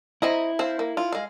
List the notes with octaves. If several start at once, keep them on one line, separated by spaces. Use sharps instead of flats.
C4 E4 D#5 A#5
C4 C5 F5
A#3
F4
G#3 F5